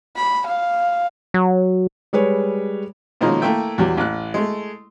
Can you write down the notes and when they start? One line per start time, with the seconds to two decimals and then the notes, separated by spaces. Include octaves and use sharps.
0.16 B5
0.46 F5
1.34 F#3
2.13 G3 G#3 B4 C#5
3.21 B2 D#3 F3 G#3 A#3 C#4
3.42 A3 A#3 E4 E5 G5
3.78 E2 F#3 G3
3.97 A1 F#6
4.34 G#3 A3